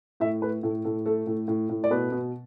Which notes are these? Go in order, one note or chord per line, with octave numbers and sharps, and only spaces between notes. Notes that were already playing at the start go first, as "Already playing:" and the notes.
A2 E5
A3 B4
A2 A4
A2 A4
A3 A4
A2
A2
A2
D5
B2 B4
B2